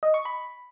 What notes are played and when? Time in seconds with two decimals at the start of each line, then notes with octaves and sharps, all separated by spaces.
0.03 D#5
0.14 C#6
0.25 B5